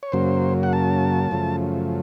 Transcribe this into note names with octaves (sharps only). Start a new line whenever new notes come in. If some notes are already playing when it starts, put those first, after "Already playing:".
C#5
F#2 C#3 F#3 A#3 C5
F#5
A5
F#2 C#3 F3 A3